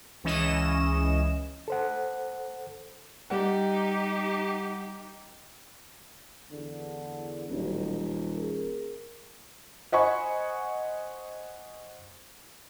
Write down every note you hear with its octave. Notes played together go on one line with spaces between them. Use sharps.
C#2 E3 C#4 D#5 E7
A4 C5 F#5
G3 D#4 G4 F#5
E2 D3
D#1 A1 F#3
G#4 A#4
C5 D#5 F#5 G#5 B5 C#6